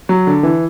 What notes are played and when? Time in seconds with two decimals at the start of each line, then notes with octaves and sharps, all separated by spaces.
0.09 F#3
0.27 D3
0.43 E3